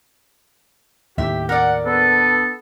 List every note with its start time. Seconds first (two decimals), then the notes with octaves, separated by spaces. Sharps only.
1.18 D#2 A2 G4 E5
1.49 A#4 D5 F#5
1.85 B3 D4 A4 B4